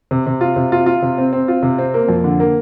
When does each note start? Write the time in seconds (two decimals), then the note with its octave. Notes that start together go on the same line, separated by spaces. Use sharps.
0.11 C3
0.26 C3
0.41 F4
0.56 C3
0.72 F4
0.86 F4
1.02 C3
1.18 C4
1.33 C4
1.48 F4
1.63 C3
1.78 C4
1.94 A#3
2.08 F2
2.24 D3
2.40 A#3